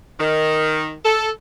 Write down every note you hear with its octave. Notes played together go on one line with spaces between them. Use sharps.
D#3
A4